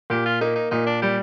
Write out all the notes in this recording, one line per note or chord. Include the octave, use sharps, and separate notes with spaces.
A#2 G4
F4
A#3 D#4
D#4
A#2 D#4
D4
G3 G4